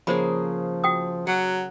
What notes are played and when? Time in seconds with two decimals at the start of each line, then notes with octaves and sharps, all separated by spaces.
0.07 C#3 F3 A#3 G#4 C5 B5
0.84 F#4 G5 D#6
1.27 F#3 F#5